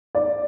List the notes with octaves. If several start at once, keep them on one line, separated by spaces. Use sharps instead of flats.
D5